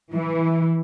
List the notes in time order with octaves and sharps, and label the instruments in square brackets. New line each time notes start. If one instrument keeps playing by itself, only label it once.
[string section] E3